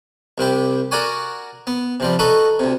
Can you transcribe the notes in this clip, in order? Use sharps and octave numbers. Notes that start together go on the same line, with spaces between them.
C2 C3 E4 G4
F#4 A#4 D5 F#5 G#5 C#6
B3
C3 F3 G3
D#4 F#4 A4 B4 B5 C#6
D2 C3